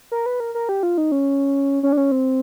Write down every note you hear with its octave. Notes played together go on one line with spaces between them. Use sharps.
A#4
B4
A#4
A#4
G4
F4
D#4
C#4
C#4
D4
C#4
C4